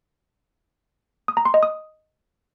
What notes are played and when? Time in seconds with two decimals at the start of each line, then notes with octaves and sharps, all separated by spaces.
1.28 D#6
1.37 A#5
1.45 C6
1.54 D#5
1.63 D#6